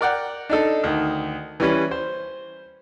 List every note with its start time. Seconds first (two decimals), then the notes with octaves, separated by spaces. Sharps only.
0.01 A#4 D5 F#5 G5
0.50 D4 D#4 A4
0.84 D2 D#3
1.60 E3 G3 C#4 B4
1.91 C5